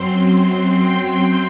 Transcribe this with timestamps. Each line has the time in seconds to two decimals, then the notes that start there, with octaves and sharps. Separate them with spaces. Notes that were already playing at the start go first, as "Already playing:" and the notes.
Already playing: F#2 F#3 C4 C6
0.78 G5